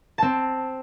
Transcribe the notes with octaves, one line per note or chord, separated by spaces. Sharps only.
C4 A5